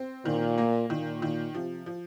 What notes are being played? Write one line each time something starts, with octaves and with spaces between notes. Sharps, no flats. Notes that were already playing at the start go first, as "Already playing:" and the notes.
Already playing: C4
A#2 D#3
A#3
A#2 D#3
D#3
C3 F3
F3